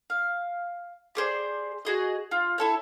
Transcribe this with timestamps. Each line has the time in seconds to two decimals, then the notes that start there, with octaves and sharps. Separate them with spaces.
0.10 F5
1.15 G4 G#4 C5 D5
1.85 F#4 G#4 D#5
2.31 F4
2.58 E4 A4 C#5